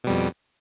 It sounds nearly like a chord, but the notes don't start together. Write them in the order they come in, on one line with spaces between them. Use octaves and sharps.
B2 G3 F2